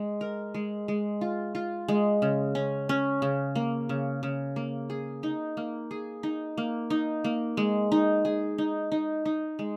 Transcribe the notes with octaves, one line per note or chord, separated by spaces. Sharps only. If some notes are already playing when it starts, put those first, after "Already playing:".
Already playing: G#3
A#4
G#3
G#3
F4
F4
G#3
C#3
C#4
C#4
C#3
A#3
C#3
C#3
A#3
G#4
D#4
A#3
G#4
D#4
A#3
D#4
A#3
G#3
D#4
G#4
D#4
D#4
D#4
G#3